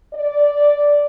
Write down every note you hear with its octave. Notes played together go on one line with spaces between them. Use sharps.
D5